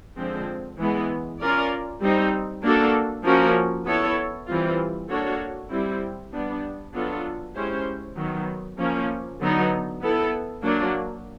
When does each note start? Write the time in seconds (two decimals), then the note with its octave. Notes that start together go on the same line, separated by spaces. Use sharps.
0.17 D3 F3 G#3 C4
0.79 E3 G#3 B3
1.40 C#4 F4 A#4 D5
2.01 G3 C4 D#4
2.63 A#3 D4 F#4 A4
3.24 F3 A#3 C#4 F#4 A#4
3.86 B3 E4 A4 C#5
4.47 E3 G3 C4 F4
5.09 A#3 D4 F#4 A4 C#5
5.70 G3 C4 E4
6.32 G3 B3 D4
6.94 F#3 B3 D4 F4 A4
7.55 G#3 C#4 E4 G4 C5
8.17 D#3 F#3 B3
8.79 F3 A#3 C#4
9.40 D3 F#3 B3 D#4
10.01 B3 E4 A4
10.63 F#3 A#3 D4